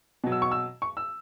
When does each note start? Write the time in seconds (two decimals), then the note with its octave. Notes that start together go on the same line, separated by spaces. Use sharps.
0.24 B2 F#3
0.32 E6
0.42 C#6
0.51 E6
0.82 C#6
0.97 E6